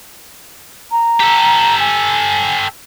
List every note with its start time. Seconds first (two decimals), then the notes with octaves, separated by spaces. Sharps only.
0.91 A#5
1.20 G4 A4
1.80 G#5